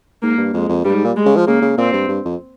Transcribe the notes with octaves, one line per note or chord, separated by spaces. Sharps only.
G#2 A#3
G2
F2 G#3
F2
G2 G3
G#2
A#2
G#3
C#3
F3
C#3 A#3
C#3
A#2 C4
G2
G2
F2